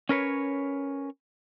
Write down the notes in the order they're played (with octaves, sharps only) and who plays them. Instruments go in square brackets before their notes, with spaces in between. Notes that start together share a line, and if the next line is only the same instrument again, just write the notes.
[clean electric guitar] C#4 A#4 B4 C#5